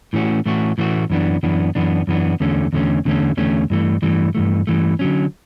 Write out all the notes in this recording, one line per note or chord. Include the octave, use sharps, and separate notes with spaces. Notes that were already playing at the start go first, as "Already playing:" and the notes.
A2 E3 A3 C#4 F#4
A2 E3 A3 C#4 F#4
A2 E3 A3 C#4 F#4
F#2 E3 B3 D4
F#2 E3 B3 D4
F#2 E3 B3 D4
F#2 E3 B3 D4
E2 D3 A3 C#4
E2 D3 A3 C#4
E2 D3 A3 C#4
E2 D3 A3 C#4
G2 E3 A3
G2 E3 A3
G2 E3 A3
G2 E3 A3
D3 F#3 C#4